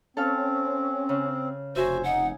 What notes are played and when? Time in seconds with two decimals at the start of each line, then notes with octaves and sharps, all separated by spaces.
0.17 C4 C#4 A4 F5 F6
1.09 C#3
1.76 F1 F#4 C5 E5 G#5
2.04 D#4 F#5